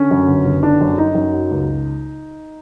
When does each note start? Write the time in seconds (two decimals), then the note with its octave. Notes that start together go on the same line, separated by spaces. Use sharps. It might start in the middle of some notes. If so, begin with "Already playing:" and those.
Already playing: D3 C#4
0.11 F#2
0.29 G1
0.45 G1
0.63 D3 D4
0.81 F#2
0.98 F#2 D#4
1.15 F#2
1.33 F#3
1.51 C#2